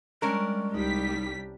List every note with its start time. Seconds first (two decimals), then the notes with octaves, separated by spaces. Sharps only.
0.22 G3 G#3 C#4 D4 A#4 C#6
0.74 C2 G3 D#4 B6